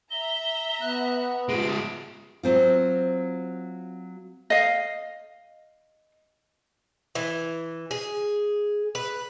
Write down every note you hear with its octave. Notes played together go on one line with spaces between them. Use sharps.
E5 A#5 G7
B3 F#6
F3 G#3 D7
F#3 C4 F4
D#5 F5
E3
G#4
B4